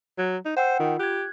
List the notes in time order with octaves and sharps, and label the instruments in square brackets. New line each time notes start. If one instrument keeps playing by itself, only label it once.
[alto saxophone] F#3
D#4
[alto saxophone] C5 [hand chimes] F#5 G5 E6
[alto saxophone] D#3 [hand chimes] F4
[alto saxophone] G4 [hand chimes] F#6 G#6